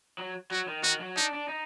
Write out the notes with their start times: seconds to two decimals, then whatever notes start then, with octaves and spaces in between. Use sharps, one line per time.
0.18 F#3
0.51 F#3 F#4
0.68 D#3
0.83 D#3 F#4
1.01 F#3
1.16 D4 D#4
1.33 D4
1.48 D#4